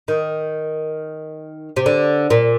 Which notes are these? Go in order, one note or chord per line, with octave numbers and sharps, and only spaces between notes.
D#3
C3
D3
A#2